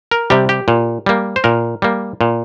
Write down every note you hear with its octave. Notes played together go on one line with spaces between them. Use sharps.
A#4
C3 G3 G4
G4
A#2
G3 A#3
C5
A#2 A#4
G3 A#3
A#2